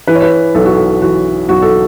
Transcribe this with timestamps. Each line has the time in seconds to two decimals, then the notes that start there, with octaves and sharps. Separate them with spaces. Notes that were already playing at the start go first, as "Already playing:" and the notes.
0.07 E3 B4
0.15 C#5
0.22 B4
0.55 B1 A4
0.65 F#4
0.76 A4
1.02 E3 F#4
1.49 B1 F#4
1.62 A4